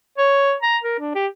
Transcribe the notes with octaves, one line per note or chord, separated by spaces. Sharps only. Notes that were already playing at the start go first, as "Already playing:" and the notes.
C#5
A#5
A#4
D4
G4